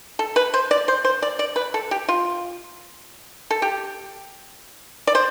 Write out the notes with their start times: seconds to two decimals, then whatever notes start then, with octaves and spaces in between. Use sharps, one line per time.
0.19 A4
0.36 B4
0.54 C5
0.71 D5
0.88 C5
1.04 C5
1.22 D5
1.39 D5
1.56 B4
1.74 A4
1.91 G4
2.08 F4
3.50 A4
3.62 G4
5.07 D5
5.15 C5